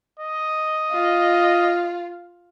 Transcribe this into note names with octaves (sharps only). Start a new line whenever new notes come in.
D#5
F4